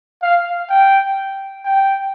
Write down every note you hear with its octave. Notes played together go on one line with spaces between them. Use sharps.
F5
G5
G5